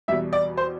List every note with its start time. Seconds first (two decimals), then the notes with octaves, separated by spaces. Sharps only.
0.08 E2 B2 G3 E5
0.33 D5
0.57 C5